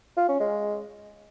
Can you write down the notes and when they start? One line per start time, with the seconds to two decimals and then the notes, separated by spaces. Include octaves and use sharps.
0.17 F4
0.28 C#4
0.40 G#3